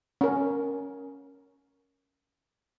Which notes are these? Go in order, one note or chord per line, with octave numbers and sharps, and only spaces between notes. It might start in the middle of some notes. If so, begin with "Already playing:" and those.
C#4 A#4